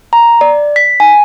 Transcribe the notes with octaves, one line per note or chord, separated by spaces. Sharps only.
A#5
D5
B6
G#5